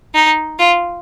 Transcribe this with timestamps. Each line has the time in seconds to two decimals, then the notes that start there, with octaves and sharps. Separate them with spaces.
0.15 D#4
0.59 F4